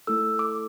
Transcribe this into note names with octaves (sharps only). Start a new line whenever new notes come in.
A3 E4 A4 E6
D6